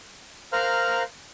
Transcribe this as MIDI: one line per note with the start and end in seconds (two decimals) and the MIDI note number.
0.53 1.03 70
0.53 1.03 72
0.53 1.03 77
0.53 1.03 82
0.53 1.03 89
0.53 1.03 90